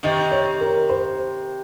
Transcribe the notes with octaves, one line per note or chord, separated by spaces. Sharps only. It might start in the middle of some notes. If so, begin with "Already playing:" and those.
C3 D#3 D#5
C#5
A#4
C5